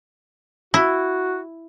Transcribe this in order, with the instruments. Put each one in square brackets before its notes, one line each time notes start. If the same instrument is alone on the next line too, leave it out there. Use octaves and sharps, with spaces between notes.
[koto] E4 [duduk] F#4